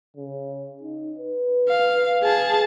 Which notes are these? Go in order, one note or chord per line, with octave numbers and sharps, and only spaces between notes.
C#3
D#4
B4
F5
G#4 A5